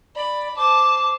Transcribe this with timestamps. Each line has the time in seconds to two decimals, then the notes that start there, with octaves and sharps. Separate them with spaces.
0.16 D5 B5
0.56 C5 A5 D6